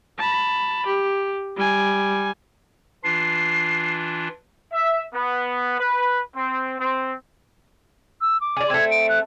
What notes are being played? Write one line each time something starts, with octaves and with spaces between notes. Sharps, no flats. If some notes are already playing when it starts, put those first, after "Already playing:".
A5 B5
G4
G3 G#5
E3 D4 F4 C7
E5
B3
B4
C4
C4
E6
D6
G#4 D5
A3 C4 G#6
D7
F#6